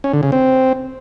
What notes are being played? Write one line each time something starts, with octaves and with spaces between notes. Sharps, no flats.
C#4
D3
C#3
C4